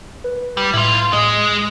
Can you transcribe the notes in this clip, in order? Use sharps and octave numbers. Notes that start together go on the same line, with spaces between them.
B4
G3
A2 E4 F4
G#3 D#5